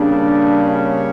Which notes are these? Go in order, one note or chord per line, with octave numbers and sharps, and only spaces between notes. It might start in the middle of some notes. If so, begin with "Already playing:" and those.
Already playing: C#3 G3 A#3 D4
C#4